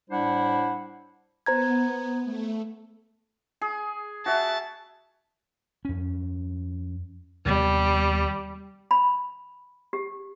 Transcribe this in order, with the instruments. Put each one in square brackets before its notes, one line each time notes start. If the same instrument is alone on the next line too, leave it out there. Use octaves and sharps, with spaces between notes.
[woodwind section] A2 G3 D4 E4 C5 F#5
[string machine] B3 [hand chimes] C5 A#5 G#6
[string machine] A3
[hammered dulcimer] G#4
[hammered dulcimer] F#4 E5 [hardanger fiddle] A5
[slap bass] F2 C#4
[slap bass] D#2 C3 B3 [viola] G3
[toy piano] B5
G4